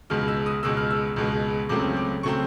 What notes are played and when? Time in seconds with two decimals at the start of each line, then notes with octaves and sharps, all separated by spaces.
0.10 C#2 B2 G#3 F6
0.28 E6
0.46 D#6
0.63 C#2 B2 G#3 E6
0.77 F6
0.90 E6
1.16 C#2 B2 G#3
1.69 C#2 C#3 F#3 A3 C4 D6
1.96 D6
2.23 C#3 F#3 A3 C4 C#6